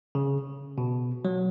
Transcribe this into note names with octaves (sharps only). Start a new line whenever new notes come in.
C#3
B2
F#3